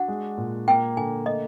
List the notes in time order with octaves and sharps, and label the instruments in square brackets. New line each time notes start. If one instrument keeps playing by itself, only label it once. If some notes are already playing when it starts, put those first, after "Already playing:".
Already playing: [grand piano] D4 F#4 [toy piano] F#5
[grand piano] G#3
A#2
[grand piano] A#3 [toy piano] G5
[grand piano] D3 [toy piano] G#5
[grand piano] A3 [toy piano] D#5